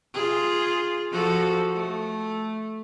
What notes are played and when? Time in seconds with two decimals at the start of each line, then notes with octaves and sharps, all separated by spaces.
0.14 F4 G#4
1.11 F3 F#4 A4
1.74 A3